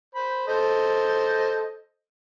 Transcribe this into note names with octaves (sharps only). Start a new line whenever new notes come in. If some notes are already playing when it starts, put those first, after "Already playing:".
C5 B5
A4 C5 D#5